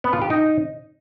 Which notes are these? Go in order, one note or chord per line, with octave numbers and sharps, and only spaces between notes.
B3
F4
G4
D#4